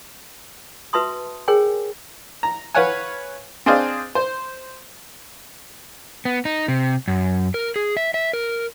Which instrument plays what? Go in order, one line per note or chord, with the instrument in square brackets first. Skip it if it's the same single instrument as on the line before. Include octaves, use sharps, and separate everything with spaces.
[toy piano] F#4 B4 E5 A5 C6 D#6
G#4 A#4 C#5 G5 G#5
[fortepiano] A#5
B4 C#5 F5 F#5 G#5
C4 D4 G#4 C5 D#5 F5
C5
[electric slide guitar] B3
D#4
C3
F#2
A#4
G#4
E5
E5
A#4